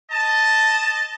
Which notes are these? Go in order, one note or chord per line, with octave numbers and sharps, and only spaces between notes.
D#5 A5